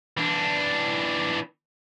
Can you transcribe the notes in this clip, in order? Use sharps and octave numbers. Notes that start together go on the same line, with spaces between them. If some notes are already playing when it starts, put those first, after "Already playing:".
E3 D4